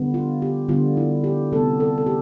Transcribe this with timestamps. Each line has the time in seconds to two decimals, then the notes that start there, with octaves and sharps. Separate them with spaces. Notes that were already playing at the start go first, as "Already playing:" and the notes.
Already playing: D3 G3 B3
0.14 F4
0.42 G4
0.69 D3 G3 B3 F4
0.97 E4
1.24 G4
1.52 C3 G3 B3 A4
1.80 A4
1.98 A4
2.06 G4